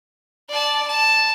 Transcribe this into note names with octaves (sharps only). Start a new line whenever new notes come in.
D5 A5
A5